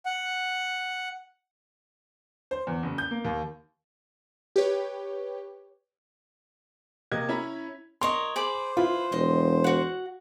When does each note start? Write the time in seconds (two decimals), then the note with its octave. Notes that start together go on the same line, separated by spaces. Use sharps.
0.05 F#5
2.51 C5
2.67 E2
2.83 F#1
2.98 G6
3.11 A#3
3.24 D#2
4.56 G4 B4 C#5
7.12 C3 A#3 D#5 G#6
7.29 C#4 E4 A#5 B5
8.01 A#4 C#5 D#5 C6
8.36 G#4 C5 B5 D6
8.77 E4 F4 B4
9.12 E1 D#5 C6
9.64 F#4 F#5